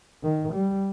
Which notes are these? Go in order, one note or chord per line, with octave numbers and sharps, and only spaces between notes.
D#3
G3